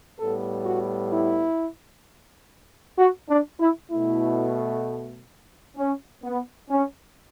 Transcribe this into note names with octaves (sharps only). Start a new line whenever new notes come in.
A2 G3 B3 A4
F#4
E4
F#4
D4
E4
B2 A3 E4
C#4
B3
C#4